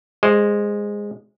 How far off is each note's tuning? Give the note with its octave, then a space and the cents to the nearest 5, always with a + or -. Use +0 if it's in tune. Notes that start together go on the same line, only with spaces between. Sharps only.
G#3 -10 C5 +0